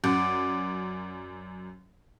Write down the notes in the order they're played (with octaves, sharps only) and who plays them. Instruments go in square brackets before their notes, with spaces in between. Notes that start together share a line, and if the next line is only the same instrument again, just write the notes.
[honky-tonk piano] F#2 [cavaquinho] D5 F#5